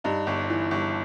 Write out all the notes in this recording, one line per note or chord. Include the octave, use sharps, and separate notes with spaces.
G2 D#4
G1
E3
G1